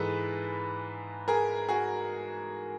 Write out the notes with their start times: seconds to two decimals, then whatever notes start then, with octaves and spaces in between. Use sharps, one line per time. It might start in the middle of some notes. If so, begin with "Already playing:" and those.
Already playing: G#2 E3 G#3 A4 B4
1.28 G#4 A#4
1.69 F#4 G#4